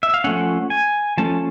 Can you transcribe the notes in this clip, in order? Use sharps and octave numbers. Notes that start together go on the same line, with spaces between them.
E5
F5
F3 A3 C#4 F#5
G#5
F3 A3 C#4 A5